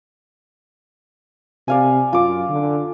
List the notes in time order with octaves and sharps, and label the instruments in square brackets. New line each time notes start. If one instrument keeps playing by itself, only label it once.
[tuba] C3 [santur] D5 F5 G#5
[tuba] F#2 [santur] F4 D6
[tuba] D3